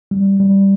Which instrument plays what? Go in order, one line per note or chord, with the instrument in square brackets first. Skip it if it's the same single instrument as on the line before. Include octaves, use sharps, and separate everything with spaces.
[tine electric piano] G3
G3